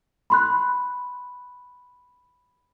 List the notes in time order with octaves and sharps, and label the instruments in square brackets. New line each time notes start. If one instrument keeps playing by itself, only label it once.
[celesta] B5 C6 F#6